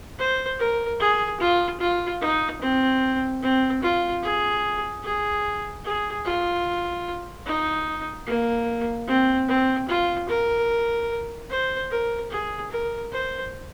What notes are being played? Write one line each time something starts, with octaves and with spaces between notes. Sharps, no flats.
C5
A#4
G#4
F4
F4
D#4
C4
C4
F4
G#4
G#4
G#4
F4
D#4
A#3
C4
C4
F4
A#4
C5
A#4
G#4
A#4
C5